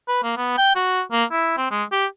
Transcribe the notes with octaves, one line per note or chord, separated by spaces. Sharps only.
B4
A#3
B3
G5
F#4
A#3
E4
C4
G#3
G4